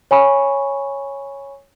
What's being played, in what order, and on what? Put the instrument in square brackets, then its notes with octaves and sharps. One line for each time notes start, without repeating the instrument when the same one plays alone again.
[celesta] C#5 G#5 B5 C#6